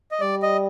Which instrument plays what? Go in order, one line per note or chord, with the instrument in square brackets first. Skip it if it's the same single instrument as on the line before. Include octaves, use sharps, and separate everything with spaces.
[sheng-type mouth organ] D#5
[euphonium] G3 [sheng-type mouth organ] D5
[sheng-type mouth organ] D#5